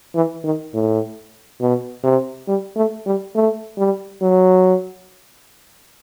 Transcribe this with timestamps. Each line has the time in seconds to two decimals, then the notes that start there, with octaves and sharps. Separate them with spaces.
0.15 E3
0.44 D#3
0.74 A2
1.60 B2
2.03 C3
2.48 G3
2.76 A3
3.06 G3
3.35 A3
3.78 G3
4.22 F#3